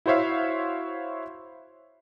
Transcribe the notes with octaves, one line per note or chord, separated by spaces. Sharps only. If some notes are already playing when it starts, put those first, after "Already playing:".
E4 F#4 C5 C#5 E5 F5